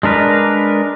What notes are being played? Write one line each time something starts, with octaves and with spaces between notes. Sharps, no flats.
G#3 D4 A#4 B4